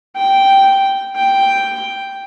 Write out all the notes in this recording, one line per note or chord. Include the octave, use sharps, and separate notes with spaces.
G5
G5